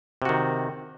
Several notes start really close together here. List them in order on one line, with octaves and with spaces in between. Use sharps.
C3 F#4 D#3